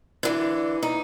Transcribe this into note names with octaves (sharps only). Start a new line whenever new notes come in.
D3 E3
D#4